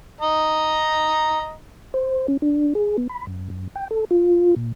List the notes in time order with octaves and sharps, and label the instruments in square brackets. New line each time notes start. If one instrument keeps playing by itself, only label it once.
[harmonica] D#5 A#5
[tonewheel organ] C5
C#4
D4
G#4
B3
B5
F#2
F#2
G5
A4
F4
A#2